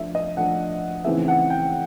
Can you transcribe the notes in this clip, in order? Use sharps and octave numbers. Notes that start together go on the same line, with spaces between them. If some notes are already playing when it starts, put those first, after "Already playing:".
Already playing: F3 A3 D4 E5
D#5
F3 A3 D4 F#5
C#3 E3 A3 C4 D#4 E5
F#5
G5